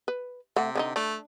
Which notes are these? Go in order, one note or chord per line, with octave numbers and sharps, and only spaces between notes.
B4
C3 A3 F#5
D3 D4 D#4
A3 D4